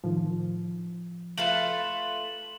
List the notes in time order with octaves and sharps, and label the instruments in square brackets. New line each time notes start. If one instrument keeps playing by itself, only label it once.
[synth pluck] A2 D#3 [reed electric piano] F3
[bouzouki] A3 F4 B4 [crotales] E7 F#7